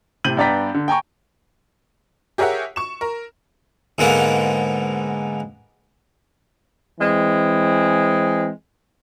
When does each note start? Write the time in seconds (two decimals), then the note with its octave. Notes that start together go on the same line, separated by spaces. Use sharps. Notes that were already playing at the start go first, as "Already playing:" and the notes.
0.24 A2 C3 G6 D#7 F#7
0.37 G2 B3 D5 G5 A#5 B6
0.74 D3
0.88 G5 G#5 A#5 C#6
2.38 G4 G#4 A#4 C#5 E5 F#5
2.76 C#6 E7
3.01 A#4
3.98 G#2 D3 A#3 B3
7.00 E3 G#3 C4